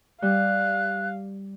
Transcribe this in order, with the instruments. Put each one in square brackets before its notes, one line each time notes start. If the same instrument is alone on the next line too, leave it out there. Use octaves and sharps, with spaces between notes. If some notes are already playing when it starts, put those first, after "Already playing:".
[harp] G3 [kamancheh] F5 [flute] F#6